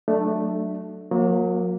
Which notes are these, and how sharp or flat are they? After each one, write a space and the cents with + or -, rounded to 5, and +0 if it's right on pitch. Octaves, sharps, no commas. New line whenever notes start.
F#3 +0 A3 +0 D4 +20
F#3 -40 A#3 +0